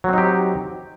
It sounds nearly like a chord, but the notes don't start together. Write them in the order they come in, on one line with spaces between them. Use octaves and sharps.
F#3 C4 D#4 G4